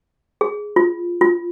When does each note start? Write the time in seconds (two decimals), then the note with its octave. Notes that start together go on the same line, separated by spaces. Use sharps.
0.41 G#4
0.76 F4
1.21 F4